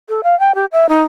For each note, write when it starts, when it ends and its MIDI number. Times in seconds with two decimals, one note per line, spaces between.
0.09 0.21 69
0.24 0.38 77
0.40 0.55 79
0.55 0.65 67
0.72 0.89 76
0.89 1.02 63